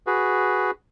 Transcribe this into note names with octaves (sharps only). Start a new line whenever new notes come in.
F#4 G#4 B4